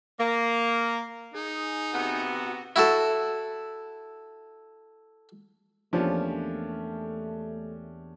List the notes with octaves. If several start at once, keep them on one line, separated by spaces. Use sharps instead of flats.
A#3
D#4 G#4
C3 B3 F#4
E4 F#4 A4
E2 F3 A3 A#3 C#4 D4 G4 C#5